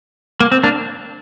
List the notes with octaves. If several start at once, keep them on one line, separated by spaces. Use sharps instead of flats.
A#3
C4
A#3 D4